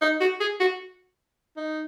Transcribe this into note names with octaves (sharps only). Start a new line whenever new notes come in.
D#4
F#4
G#4
F#4
D#4